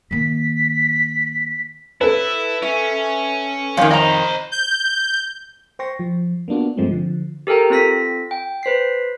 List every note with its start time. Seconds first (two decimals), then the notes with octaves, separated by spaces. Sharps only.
0.11 D#3 A#3 B6
2.01 E4 A4 B4
2.62 C#4 E5
3.77 F2 D#3 G4 C#5 F5
3.91 C5 D#5 A#5 B5
4.52 G6
5.79 C5 G5 C6 C#6 A#6
5.99 F3
6.48 A#3 B3 D4 F4 F#4
6.77 G2 F3 G#3 A3 C4
6.91 D3 F3
7.47 G4 A4 A#4 G5 A#5
7.70 C4 F4 A4 A#6 B6
8.31 G5
8.63 B4 C5 B6 C7